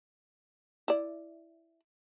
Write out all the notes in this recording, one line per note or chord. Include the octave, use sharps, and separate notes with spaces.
E4 D5